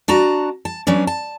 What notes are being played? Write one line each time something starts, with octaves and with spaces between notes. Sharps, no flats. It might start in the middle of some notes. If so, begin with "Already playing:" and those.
D4 F#4 A5 A#5
A5
F#3 B3 C#4 D4
A5